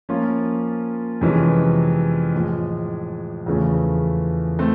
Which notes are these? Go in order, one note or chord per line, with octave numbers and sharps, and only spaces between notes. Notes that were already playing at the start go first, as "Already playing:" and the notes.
F3 A#3 C#4 F4
F2 C3 E3 G#3 C#4
A2 F3 G#3
E2 C#3 F3 A3 C#4
A3 C4